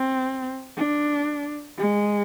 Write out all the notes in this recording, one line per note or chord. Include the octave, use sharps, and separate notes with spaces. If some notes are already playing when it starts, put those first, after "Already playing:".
Already playing: C4
D4
G#3